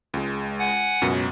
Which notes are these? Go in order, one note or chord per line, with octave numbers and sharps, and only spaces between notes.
C#2 G#3
F#5 G#5
C#2 F#2 B2